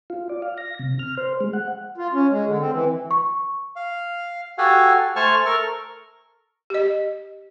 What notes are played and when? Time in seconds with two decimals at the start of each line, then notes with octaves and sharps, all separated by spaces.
0.10 F4
0.29 D5
0.42 F5
0.58 A#6
0.79 C3
0.99 F6
1.17 C5
1.40 G#3
1.53 F#5
1.98 F4
2.13 C#4
2.30 G#3
2.46 D3
2.60 C4
2.72 E3
3.11 C#6
3.76 F5
4.58 F#4 G4 A4 F5 F#5 G#5
5.16 A3 C5 G#5 A5 C#6 F6
5.46 A4 A#4 C#6 F6
6.70 G4 D#5